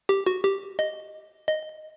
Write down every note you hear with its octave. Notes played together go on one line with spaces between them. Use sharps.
G4
F#4
G4
D#5
D#5